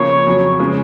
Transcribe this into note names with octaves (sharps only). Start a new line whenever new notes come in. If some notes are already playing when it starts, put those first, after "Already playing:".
Already playing: C#3 F3 A#3 C#5
F2 C#3 F#3
C#3 F3 G#3 C#4